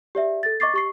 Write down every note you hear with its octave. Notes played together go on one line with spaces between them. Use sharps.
G4 D5 E5
A4 A6
D#5 C#6 D6 A6 C7
G4 C#6 C7